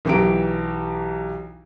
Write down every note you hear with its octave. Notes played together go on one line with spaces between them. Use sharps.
B1 E3 G4 A#5 D7